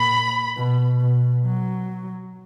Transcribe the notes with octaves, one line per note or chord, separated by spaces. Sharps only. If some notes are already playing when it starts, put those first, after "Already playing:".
Already playing: A#2 B5
B2
B2
F#3